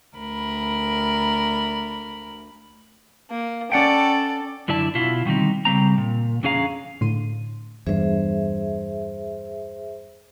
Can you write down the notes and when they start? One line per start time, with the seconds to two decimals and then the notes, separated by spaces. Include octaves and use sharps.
0.16 D2 A#4 B5
3.31 A#3
3.72 C#4 A4 D5 F#5 G5
4.68 F#2 D3 E4 D5 A5
4.95 B2 E4 F4
5.25 D3 D#3 G3 C4 D#4
5.65 C#3 G3 C4 A#5
5.98 A#2
6.43 F2 D3 C#4 G#4 F5 A#5
7.01 A2 D3 C6 D#7
7.87 E2 G2 G#4 C5 E5